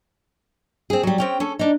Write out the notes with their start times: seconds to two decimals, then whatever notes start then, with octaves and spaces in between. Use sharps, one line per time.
0.90 C4 G#4
1.03 F#3 G3
1.18 C4 C#4 G5
1.40 C#4 A4
1.59 D4 D#4